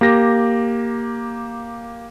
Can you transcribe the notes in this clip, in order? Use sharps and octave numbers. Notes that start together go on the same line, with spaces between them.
A#3 G4 A#6